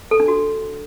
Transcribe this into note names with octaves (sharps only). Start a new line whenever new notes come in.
A4
D4
F#4